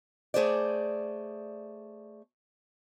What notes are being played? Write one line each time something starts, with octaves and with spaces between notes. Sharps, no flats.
A3 G#4 C5 D5